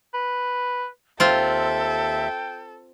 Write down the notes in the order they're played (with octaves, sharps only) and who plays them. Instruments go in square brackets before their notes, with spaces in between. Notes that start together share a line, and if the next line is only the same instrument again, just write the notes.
[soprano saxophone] B4
[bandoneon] D#2 E5 [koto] C4 F4 [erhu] A4 [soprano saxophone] G5